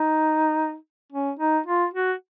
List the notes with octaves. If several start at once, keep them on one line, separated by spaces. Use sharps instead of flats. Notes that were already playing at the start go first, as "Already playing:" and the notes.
Already playing: D#4
C#4
D#4
F4
F#4